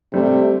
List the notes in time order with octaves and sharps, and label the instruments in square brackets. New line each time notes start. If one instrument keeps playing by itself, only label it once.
[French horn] C3 [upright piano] G3 A3